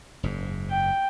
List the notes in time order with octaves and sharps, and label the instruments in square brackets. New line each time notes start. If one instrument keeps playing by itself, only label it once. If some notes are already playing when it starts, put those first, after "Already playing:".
[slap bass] F#1 G#2
[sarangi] G5